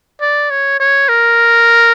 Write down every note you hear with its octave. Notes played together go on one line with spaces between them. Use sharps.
D5
C#5
C#5
A#4